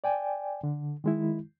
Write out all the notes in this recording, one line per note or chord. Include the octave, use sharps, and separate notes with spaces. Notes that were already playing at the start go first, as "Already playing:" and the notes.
D5 G5 G#5
D3
D#3 G#3 E4